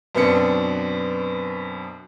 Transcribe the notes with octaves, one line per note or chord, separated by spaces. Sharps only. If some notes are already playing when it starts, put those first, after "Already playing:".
F#2 B2 B3 C4 D4 C#7